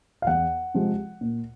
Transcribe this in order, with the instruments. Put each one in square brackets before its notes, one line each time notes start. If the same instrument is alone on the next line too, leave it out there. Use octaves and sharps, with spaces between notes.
[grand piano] F5
E2 F#5
C3 F3 G#3
A#2